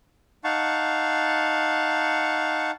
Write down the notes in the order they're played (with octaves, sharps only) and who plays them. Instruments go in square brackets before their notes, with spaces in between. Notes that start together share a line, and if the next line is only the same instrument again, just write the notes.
[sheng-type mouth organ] D#4 F5 F#5 A5 C#6